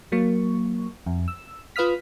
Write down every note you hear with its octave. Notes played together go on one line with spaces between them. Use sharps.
F#3 A#3 C#6
F2
E6
F4 B4 F5 D#6 F6 B6